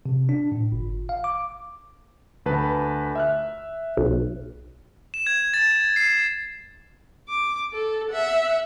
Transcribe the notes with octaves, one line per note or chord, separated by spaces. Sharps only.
C3
D4
A2
G1
F5
D6
D2 B4 A5
E5 F6 F#6
B1
E7
G#6
A6
C7
D6
A4
E5 F#5